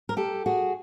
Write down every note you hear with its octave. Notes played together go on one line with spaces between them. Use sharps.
A#4
G4 A4
F#4 G#4